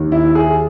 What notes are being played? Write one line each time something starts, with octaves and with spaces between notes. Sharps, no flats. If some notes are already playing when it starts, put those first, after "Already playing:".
Already playing: D#2 D#3
E4
G#4